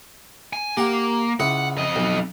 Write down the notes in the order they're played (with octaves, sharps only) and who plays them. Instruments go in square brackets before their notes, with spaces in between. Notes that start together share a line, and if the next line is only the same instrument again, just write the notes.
[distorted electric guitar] G#5
[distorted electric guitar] A#3 [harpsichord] G4 F#5
[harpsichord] C#2 E4 D#6 [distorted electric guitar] F#5
[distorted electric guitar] F2 D#5
[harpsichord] B1